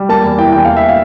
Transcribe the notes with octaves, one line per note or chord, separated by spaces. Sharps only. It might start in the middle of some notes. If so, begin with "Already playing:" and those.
Already playing: G3
A#3 A5
E2
E3 G5
E2 G5
A#3 F5
E5
F5